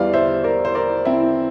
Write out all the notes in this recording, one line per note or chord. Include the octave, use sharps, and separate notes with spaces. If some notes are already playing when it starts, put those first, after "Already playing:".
Already playing: E2 E3 G3 D5 F5
C5 E5
A#4 D5
C5
A#4 D5
C4 E4